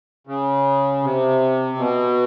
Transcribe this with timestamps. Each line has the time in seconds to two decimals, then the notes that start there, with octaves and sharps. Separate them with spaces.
0.27 C#3
1.03 C3
1.77 B2